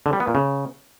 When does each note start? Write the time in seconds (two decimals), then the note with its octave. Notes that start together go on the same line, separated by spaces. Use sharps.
0.06 D3
0.13 G3
0.20 B3
0.27 A#2
0.35 C#3